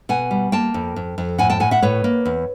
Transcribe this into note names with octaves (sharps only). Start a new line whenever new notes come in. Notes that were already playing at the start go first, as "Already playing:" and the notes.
B2 F#5 G#5
G3
A#3 G5 A5
F2
F2
F2
A2 F#5 G#5
G5 A5
A2 F#5 G#5
E5 F#5
A2 B4 C#5
A#3
E2